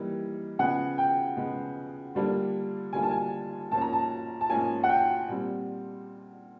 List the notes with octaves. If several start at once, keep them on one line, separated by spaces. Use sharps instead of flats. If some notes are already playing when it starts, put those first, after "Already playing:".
Already playing: E3 G3 A#3 D#4
C#3 F3 G#3 B3 F#5
G5
C#3 F3 G#3 B3
D3 G3 A#3 D4 F4
D3 G3 A#3 D4 F4 G#5
A5
G#5
G#2 F3 A#3 C#4 F4 A5
A#5
A5
A5
G#2 F3 A#3 C#4 F4 G#5
F#5
G5
A#2 G3 C4